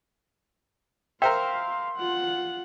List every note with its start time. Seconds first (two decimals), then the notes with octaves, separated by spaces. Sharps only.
1.22 A#4 C5 E5 F5 G5 C6
1.97 F4 F#5